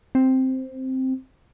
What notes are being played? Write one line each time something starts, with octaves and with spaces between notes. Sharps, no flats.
C4